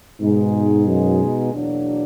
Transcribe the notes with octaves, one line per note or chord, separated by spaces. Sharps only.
G#2 B2 G#3 B3 D#4
F#2
E2 B2 F#3 A#3 D4